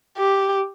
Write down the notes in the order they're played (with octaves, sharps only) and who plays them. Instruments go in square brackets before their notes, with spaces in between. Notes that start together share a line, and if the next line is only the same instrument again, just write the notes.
[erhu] G4